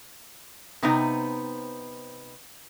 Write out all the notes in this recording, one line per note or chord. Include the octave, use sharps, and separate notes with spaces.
C3 B3 C4 D#4